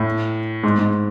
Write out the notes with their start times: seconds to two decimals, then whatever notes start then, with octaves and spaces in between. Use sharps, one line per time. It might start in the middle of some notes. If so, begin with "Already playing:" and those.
Already playing: A2
0.63 G#2
0.79 G#2